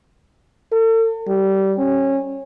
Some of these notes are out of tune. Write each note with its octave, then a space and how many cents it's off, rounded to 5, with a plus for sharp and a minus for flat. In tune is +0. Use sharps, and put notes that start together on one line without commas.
A4 +40
G3 -20
C#4 -20